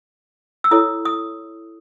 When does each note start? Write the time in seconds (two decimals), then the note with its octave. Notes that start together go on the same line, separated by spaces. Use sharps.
0.64 E6
0.71 E4 A4 C#5 D#6
1.05 D#6